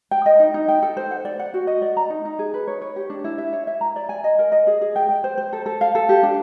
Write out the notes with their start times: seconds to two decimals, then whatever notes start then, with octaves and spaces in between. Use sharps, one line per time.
0.11 G5
0.26 D#5
0.40 D#4
0.54 D#4
0.68 G5
0.82 A4
0.97 C5
1.11 F#5
1.25 D5
1.39 F#5
1.54 F#4
1.67 D#5
1.82 D5
1.97 A#5
2.10 D#4
2.25 D#4
2.39 G#4
2.54 B4
2.67 C#5
2.82 C#5
2.96 G4
3.10 D4
3.24 E4
3.38 E5
3.53 C#5
3.67 E5
3.81 A#5
3.96 D5
4.09 G#5
4.24 D#5
4.39 A#4
4.52 D#5
4.67 G#4
4.81 G#4
4.96 G5
5.09 G5
5.24 C5
5.38 C5
5.53 A4
5.66 A4
5.81 F5
5.95 A4
6.09 G4
6.23 D4